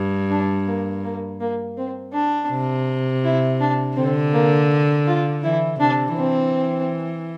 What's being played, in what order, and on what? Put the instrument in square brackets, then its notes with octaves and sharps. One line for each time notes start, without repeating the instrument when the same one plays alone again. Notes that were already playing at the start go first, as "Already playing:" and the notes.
Already playing: [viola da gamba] G2
[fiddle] D4
A#3
A#3
A#3
C4
D4
[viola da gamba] C3
[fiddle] E4
D4
[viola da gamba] D3 [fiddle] C4
[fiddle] A#3
F4
[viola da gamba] E3 [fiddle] E4
[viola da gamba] C3 [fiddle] D4
[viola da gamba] E3 [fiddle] C4